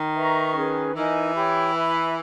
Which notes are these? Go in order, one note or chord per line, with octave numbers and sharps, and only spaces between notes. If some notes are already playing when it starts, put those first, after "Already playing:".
Already playing: D#3
B4 E5 A#5 C#6
C#4 G#4 B4
E3 D#4 A#4 D#5 G#5
G4 C#5 G5 B5
B4 E5 G#5 B5